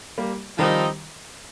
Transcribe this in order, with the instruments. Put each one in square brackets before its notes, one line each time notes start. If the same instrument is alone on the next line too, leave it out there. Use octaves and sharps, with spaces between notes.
[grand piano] G3 A#3
[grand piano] D#3 G3 [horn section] F3 C4 D#4